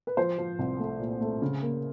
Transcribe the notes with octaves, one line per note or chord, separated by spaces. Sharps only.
B4
F3 C5
F3
C2
A3
A#2
A3
C#3
A#3